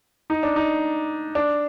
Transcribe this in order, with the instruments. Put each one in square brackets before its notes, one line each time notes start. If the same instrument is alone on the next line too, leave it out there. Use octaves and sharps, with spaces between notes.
[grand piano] D#4
D4
D#4
D4